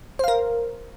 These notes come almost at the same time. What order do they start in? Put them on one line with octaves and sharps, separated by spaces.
C5 F5 A#4